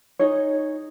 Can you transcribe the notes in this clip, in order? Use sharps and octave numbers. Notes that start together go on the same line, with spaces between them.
D#4 G#4 C#5